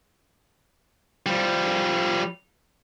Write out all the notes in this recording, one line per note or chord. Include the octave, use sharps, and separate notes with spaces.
F3 G3